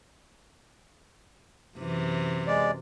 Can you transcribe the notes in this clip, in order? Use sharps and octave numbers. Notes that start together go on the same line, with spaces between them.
F#2 C3 E3
G#3 D5